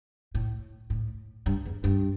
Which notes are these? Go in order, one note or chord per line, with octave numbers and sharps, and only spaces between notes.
A2
A2
G2
E2
G2